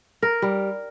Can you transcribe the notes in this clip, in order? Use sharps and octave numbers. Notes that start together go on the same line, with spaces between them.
A#4
G3